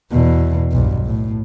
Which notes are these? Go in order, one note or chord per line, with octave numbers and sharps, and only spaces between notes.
E2 B2
B1 G2
A2